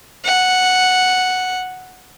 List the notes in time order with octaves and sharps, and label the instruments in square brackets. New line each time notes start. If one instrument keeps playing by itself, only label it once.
[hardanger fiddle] F#5